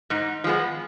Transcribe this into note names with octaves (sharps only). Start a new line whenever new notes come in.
G#2 D#4
F3 G#3 B3